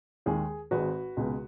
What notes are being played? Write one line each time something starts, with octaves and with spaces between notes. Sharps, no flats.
D#2 D#3 G#3 G#4
G#1 G#2 G#3 F#4 B4
C#2 B2 G#3